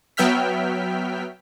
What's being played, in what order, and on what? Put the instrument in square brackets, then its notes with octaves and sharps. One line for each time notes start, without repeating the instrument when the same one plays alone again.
[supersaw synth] F#3 B3 E5 G5 F6 B6